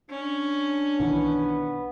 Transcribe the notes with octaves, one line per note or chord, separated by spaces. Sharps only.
C#4 D4
B1 D#3 E3 B3